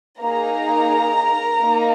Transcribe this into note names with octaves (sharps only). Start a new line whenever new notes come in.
A#3 D#4 G#4 A#4 A#5
A#3 D#4